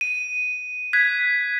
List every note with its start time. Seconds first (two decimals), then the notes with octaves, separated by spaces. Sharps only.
0.01 D#7
0.93 F#6 G#6 B6